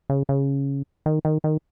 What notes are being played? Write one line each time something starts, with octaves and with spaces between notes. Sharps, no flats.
C#3
C#3
D#3
D#3
D#3